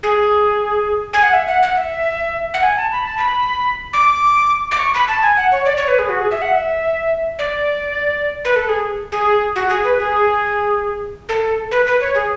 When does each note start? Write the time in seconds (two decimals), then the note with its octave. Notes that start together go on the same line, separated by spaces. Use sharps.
0.03 G#4
1.13 G#5
1.23 F#5
1.33 E5
1.48 F#5
1.63 F#5
1.77 E5
2.54 F#5
2.63 G#5
2.77 A5
2.92 B5
3.05 A5
3.18 B5
3.93 D6
4.71 D6
4.79 C#6
4.94 B5
5.08 A5
5.22 G#5
5.37 F#5
5.52 C#5
5.66 D5
5.77 C#5
5.88 B4
5.99 G#4
6.09 F#4
6.20 G#4
6.31 E5
6.42 F#5
6.52 E5
7.39 D5
8.45 B4
8.56 A4
8.69 G#4
9.12 G#4
9.56 F#4
9.69 G#4
9.84 B4
9.99 G#4
11.29 A4
11.71 B4
11.86 B4
12.01 C#5
12.15 G#4